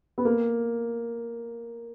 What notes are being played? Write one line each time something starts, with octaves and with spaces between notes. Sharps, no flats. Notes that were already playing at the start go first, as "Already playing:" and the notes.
B3
A#3